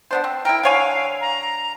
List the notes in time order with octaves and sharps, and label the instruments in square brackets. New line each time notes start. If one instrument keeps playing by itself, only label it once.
[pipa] B3 D4 C5
C4
[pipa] E4 A#4 [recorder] G5
[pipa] D3 C#5 G#5 [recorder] F5
[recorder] A#5